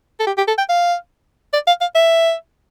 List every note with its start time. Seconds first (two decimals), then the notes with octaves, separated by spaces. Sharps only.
0.20 A4
0.27 G4
0.37 G4
0.48 A4
0.58 G5
0.69 F5
1.53 D5
1.67 F5
1.81 F5
1.95 E5